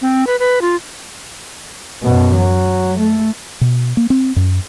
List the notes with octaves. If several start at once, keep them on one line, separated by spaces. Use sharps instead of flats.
C4
B4
B4
F4
F#2 B2
F#3
A3
B2
A#3
C4
F#2